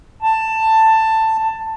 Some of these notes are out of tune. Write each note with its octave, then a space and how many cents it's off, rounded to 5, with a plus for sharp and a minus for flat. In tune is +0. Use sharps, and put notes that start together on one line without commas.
A5 +10